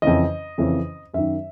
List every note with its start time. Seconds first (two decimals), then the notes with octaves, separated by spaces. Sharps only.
0.02 F2 C#3 E3 D#5
0.58 F2 C#3 E3
1.14 F#2 D#3 E5